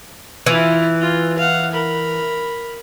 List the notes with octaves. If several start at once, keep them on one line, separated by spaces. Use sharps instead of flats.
E3 E4 F4
F4
F5 F#5
A#4 B5